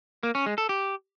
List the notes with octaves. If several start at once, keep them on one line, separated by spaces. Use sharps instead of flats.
A#3
C#4
G#3
A4
G4